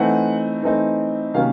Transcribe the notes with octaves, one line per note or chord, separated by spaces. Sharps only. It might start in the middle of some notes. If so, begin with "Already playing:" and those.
Already playing: E3 A3 C4 D#4 F#5
E3 A3 C4 D#4
C3 D#3 F#3 A#3 C#4 F5